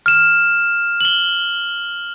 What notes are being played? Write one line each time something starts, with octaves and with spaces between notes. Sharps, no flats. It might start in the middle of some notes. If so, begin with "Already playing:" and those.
F6 E7
F#7 G7